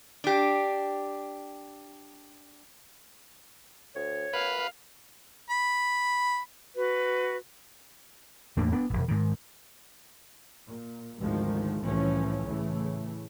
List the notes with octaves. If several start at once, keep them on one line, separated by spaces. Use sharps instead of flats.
D4 G4
D2 C#5
F#2 B4 F5
B5
F#4 B4
E2 A2 A#3 D4
B3 D4
E1 C2
G#2 D#3
A#2
G#1 D2 D#3 F3 G#3
C2 A2 E3 F3 A3 C#4
A2 C#3 E3 A3